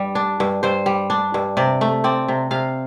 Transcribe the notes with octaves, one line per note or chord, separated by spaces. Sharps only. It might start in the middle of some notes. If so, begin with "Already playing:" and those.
Already playing: G2 G3
D4
G2
G2 C5
G3
D4
G2
C3 D5
A3
C4 D5
C3
C3 F5